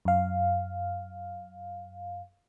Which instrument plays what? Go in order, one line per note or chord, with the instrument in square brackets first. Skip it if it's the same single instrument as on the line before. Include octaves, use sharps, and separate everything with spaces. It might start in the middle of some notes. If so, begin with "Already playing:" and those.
[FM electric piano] F#2 F5